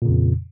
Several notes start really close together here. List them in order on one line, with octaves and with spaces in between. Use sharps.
A#2 C#3 F2